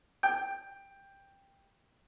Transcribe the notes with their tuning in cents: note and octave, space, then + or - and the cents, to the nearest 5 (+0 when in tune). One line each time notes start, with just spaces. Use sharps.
G5 +10